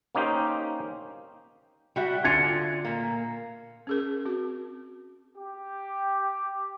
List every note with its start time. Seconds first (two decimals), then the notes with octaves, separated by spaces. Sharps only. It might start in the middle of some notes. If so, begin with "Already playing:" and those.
0.15 A#3 C#4 D#4 G4 C5
1.96 G3 F#4 E5
2.24 D3 F4 G#5 G#6 A6 C#7
2.85 A#2 A#3
3.87 C#4 G#4 A#4
4.25 C4 F#4
5.37 G4